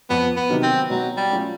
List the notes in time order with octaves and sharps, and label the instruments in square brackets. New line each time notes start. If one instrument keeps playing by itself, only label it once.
[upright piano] F2 [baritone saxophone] B3
[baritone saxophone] B3
[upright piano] C3 D#3 F#3
[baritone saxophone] C4
[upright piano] B2 [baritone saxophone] F#3
[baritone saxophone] G3
[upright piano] F#3 A3 C#4 F4